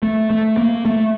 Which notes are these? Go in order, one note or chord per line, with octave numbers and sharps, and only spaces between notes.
A3
A3
A#3
A3